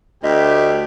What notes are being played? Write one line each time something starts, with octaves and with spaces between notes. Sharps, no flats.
D2 G4 D#5 E5